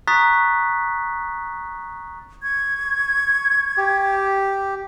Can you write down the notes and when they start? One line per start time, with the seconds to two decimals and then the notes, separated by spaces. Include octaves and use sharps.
0.08 A#5 C#6 D#6 F#6 A6 B6
2.42 C#6 G#6
3.77 G4